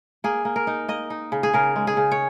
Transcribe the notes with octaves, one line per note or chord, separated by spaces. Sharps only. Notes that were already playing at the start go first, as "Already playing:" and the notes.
A#3 G#4
A#3
A#4
D#4
A#3 D#5
D#4
C#3
G#4
C#3 A#4
G#3
G#4
C#3
C#5